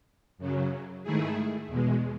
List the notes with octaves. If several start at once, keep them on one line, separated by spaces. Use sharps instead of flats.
F#2 C#3 F#3
G#2 D#3 A3 E4 G#4
E2 B2 G#3